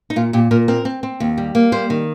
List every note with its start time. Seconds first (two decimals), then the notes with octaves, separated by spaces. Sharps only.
0.10 D#4
0.16 A#2 F4
0.33 A#2 G4
0.51 A#2 A#4
0.68 C4 A#4
0.85 C4
1.03 C4
1.20 D#2
1.38 G3
1.55 A#3
1.72 G3 C5
1.90 D#3